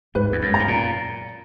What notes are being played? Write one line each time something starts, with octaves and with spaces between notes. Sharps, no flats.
G#2 B4
E2
F#2
G#2 A#5
A#2